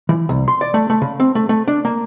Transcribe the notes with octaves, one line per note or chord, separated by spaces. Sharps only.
E3
C2
C6
D5
A3
A3
C#3
C4
A3
A3
D4
A#3